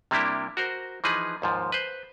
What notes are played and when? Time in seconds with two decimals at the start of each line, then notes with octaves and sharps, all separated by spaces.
0.11 C3 G3 A#3 D4 E4 G4
0.57 F#4 A#4 C5
1.04 E3 F3 D#4 G#4 B4
1.42 D#2 G#2 F3
1.72 B4 C5